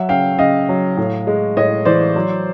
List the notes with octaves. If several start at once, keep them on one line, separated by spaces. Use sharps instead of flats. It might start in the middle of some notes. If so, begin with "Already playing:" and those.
Already playing: F#3 E5 F#5
C#3 F5 G5
C#3 D#5 F5
F#3
A2
G#3
A2 C#5 D#5
E3 C5 D5
F#3